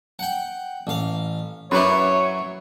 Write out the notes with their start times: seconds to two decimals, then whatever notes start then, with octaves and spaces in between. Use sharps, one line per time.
0.19 F#5 G5
0.87 A1 F5
1.71 F#2 F#3 E4 B4 C#5 D6